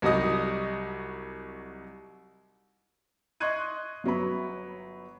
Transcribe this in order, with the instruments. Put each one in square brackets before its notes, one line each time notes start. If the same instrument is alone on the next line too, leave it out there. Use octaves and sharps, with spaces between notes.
[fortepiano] C2 F#3 G3 D#4 D#5 D#6
[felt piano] D#5 C6 C#6 F#6 G#6 D#7
G1 F#3 B3 B5